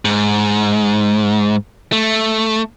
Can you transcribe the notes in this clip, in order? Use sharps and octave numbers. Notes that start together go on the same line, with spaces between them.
G#2
A3